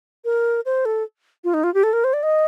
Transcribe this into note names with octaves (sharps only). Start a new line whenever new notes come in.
A#4
C5
A4
F4
D#4
F4
G4
A4
A#4
C5
D5
D#5